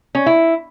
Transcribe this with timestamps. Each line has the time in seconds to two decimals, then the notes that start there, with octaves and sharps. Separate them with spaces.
0.15 C#4
0.26 E4